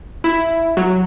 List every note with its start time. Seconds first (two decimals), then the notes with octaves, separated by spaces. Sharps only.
0.24 E4
0.77 F#3